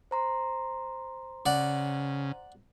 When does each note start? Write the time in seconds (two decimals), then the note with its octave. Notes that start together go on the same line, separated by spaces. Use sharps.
0.11 C5 A#5 C6
1.46 C#3 D5 F#5